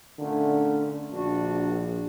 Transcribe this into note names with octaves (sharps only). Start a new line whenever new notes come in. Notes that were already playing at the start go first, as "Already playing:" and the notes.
A#2 D3 A3 C#4
A#1 D4 F#4